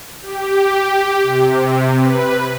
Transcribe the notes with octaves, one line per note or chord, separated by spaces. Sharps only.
G4
C3
B4